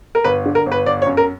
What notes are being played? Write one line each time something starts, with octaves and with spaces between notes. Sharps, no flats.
A#4
G1 B4
D3
A#4
G1
B4
G1 D5
C#5
F#2
A#4